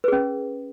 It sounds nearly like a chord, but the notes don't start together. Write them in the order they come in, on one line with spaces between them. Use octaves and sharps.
B4 G#4 C#4